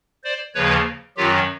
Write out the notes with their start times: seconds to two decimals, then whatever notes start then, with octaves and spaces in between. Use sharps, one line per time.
0.24 C5 D5
0.55 D#2 C#3 F3 B4 C#5
1.17 F#2 D#3 F#3 F4 G4